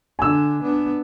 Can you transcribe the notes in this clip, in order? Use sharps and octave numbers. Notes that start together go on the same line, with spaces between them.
D3 D4 G#5 E6
B3 D4